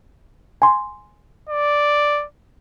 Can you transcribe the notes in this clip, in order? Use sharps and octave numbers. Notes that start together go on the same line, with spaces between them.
G#5 C6
D5